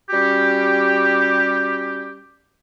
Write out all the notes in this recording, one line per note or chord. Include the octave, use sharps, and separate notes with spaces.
G3 C#4 F#4 G4